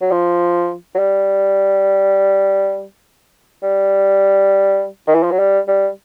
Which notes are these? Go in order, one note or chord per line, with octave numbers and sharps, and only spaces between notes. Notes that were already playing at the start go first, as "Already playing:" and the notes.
F#3
F3
F#3
G3
G3
D#3
E3
F3
F#3
G3
G3